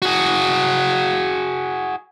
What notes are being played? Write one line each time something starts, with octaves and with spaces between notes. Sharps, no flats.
F#4 G#4